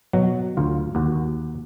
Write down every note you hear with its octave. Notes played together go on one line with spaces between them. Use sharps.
B2 F#3
D2 F4
D#2 F#4